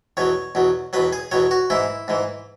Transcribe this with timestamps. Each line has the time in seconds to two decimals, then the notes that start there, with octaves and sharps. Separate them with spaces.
0.17 E2 B2 F#3 C#5
0.55 E2 B2 F#3
0.93 E2 B2 F#3 B4
1.13 G#4
1.31 E2 B2 F#3 C#5
1.51 F#4
1.70 G#2 E3 E4
2.08 G#2 E3